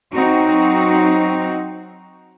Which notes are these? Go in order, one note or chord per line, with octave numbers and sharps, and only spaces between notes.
F#3 C4 D#4 F#4